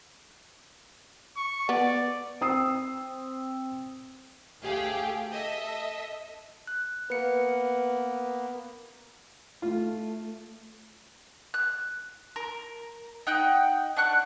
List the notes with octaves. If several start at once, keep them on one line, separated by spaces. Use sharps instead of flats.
C#6
B3 D5
C4 D#6 E6 C7
D2 A3 G4 G#4 F5 G5
A4 D#5 E5
F#6
A#3 B3 B4 C#7
A3 F4
F#6
A#4
D#4 F#5 G5
D4 F#5 C#6 F#6